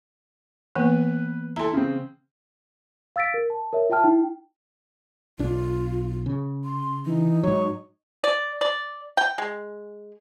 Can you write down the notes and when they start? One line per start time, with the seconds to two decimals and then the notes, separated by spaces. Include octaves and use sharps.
0.75 E3 A#3 B3 B4
1.56 E4 A4 A#5 C6
1.73 C#3 C4
3.16 F5 E6 A6 B6 D7
3.34 A#4
3.50 A5
3.73 A#4 C#5 E5
3.90 F4 E5 G5 A5 F6
4.03 D#4 E4 G5
5.39 B1 D4 F4
6.26 C#3
6.65 C6
7.06 E3 D#4
7.44 G#2 F#3 C#5
8.24 D5
8.61 D5
9.17 G5
9.38 G#3